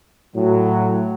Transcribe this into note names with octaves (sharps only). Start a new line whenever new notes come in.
A2 F#3